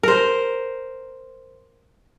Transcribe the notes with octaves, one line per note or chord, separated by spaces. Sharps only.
A#4 C5